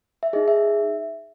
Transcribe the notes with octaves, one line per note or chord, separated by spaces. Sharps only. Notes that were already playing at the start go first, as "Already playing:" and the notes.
E5
D#4 G#4 D#5
E5